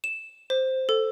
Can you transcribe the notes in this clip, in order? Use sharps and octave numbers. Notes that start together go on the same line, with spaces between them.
E7
C5
A4